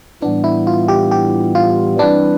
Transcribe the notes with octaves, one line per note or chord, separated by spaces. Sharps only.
A2 E3 G3 B3 D4
E4
F4
G4
G4
F4
E3 G3 C4 D4 E4 B4